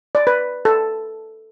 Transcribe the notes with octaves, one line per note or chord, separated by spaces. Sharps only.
D5
B4
A4